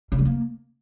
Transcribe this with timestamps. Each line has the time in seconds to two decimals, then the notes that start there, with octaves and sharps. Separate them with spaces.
0.12 C#3
0.19 G3
0.25 A#3